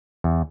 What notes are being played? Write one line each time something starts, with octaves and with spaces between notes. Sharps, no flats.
E2